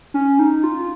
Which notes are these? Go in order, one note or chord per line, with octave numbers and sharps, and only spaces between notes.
C#4
D#4
F4